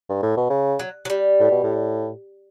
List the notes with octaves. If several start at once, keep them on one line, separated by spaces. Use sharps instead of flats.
G2
A2
B2
C#3
F#3
F#3
G3
A2
B2
A2